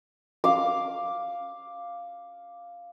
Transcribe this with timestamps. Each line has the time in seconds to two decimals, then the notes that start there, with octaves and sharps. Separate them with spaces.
0.44 F5 D6